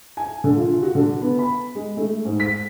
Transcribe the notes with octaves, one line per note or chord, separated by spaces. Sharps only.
G#5
D3
F4
F#4
D3
B3
B5
G#3
A3
G#2
B6